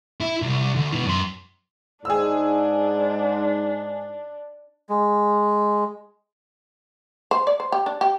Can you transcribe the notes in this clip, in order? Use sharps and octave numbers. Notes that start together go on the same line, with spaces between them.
E4
C2
D2
B2 E3
F#2 C6
G#2 D4 G#4 E6
G#3
C5
D5
C5
G4
D4
G4